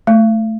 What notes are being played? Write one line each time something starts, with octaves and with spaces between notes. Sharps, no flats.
A3